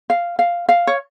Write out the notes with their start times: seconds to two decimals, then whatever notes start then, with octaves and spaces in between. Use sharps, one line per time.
0.10 F5
0.39 F5
0.69 F5
0.87 C#5